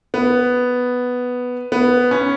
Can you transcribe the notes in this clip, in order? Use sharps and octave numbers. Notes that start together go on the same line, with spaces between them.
B3
B3
C#4